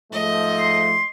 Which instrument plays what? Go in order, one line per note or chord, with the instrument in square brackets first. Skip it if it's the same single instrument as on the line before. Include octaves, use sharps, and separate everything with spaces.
[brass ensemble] G#2 F3 A3 [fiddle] D#5
[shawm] C6